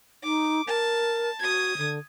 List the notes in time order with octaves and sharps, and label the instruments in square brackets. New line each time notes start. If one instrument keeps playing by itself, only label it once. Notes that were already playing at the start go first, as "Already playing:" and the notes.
[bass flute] D#4 [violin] D6
[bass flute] A#4 [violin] A5
[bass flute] F#4 [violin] D#6 G#6
[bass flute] D3